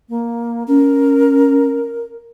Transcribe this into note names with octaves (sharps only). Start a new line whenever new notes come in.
A#3
C#4 A#4